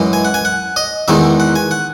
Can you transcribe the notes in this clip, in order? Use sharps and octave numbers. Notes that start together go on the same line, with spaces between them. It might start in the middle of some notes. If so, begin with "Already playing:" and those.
Already playing: F#2 E3 G#3
G#5
F#5
G#5
F#5
D#5
E2 D#3 G#3 E5
F#5
G#5
F#5